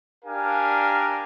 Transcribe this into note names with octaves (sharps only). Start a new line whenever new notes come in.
D4 G4 A#4 F5 G#5